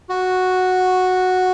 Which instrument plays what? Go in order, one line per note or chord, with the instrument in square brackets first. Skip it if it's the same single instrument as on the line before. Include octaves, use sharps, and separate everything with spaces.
[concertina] F#4